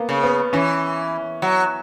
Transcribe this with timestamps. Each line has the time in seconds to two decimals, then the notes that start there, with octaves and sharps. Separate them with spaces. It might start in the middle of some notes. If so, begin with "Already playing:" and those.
Already playing: A#3 B3
0.09 C#3
0.23 B3
0.53 E3 C#4
1.42 F#3